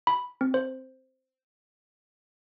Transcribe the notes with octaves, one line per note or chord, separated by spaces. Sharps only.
B5
C4
C5